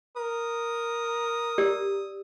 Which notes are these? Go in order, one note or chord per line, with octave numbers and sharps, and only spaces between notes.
A#4 D#6
G4 D5 E6